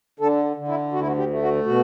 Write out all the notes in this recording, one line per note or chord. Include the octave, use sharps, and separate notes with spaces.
D3 A4
D3
E4
D2 F#4
E4
F#4
G4
A3
F#4
B2 F#4